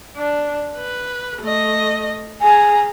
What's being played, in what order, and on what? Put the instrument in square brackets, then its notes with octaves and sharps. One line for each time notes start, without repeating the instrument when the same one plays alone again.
[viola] D4
B4
A3 D#5
[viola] G#4 A#5 [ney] G#5